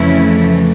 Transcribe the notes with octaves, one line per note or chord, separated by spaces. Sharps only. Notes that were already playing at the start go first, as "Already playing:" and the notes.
Already playing: F2 C#3 E3 A3 C#4 E4